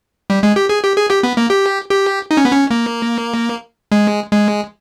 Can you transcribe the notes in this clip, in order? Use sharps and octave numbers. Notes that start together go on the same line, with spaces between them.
G3
G#3
G4
G#4
G4
G#4
G4
B3
A#3
G4
G4
D#4
C#4
B3
C#4
A#3
G#3
G#3